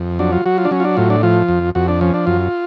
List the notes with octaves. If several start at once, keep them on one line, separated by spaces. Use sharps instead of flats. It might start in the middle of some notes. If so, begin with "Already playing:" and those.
Already playing: F2
F#3 D4
F4
F#3 F#4
F4
D4
F#3 C#4
F4
D4
A2 F4
D4
F3 F4
F2
F2 F#4
D4
F3 C#4
D4
F#2 F4